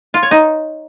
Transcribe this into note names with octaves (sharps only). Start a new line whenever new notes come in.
F4
C#5
D#4